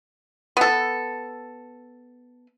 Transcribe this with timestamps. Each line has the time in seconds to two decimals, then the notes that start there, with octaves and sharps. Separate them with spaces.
0.57 B3 A4